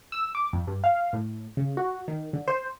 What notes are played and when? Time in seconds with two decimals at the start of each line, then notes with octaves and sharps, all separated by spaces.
0.12 E6
0.35 D6
0.53 F2
0.67 G2
0.84 F5
1.13 A2
1.57 C#3
1.77 F#4
2.08 D#3
2.33 D3
2.48 C5